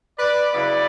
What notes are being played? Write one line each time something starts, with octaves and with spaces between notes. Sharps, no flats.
B4 D5
C#3 F#3 B3 E4 B4 D5